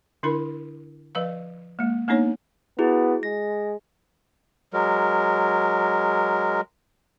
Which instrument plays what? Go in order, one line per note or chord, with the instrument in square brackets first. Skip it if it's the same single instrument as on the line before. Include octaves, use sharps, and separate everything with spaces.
[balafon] D3 D4 E4 A#4 B5
F3 B4 D#5 F5
G#3 A#3
A#3 B3 D4 D#4 C#5
[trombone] B3 [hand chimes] E4 F#4 G#4
[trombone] G#3 [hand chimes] A#6
[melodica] F#3 G#3 A#4